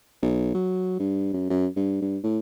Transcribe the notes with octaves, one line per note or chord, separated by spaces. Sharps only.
B1
F#3
G2
F#2
F#2
G2
G2
A2